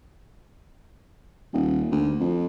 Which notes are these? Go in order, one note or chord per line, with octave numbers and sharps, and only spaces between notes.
D#1
D2
F2